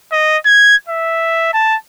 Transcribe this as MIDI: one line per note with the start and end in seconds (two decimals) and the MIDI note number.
0.12 0.37 75
0.45 0.76 92
0.88 1.53 76
1.54 1.76 81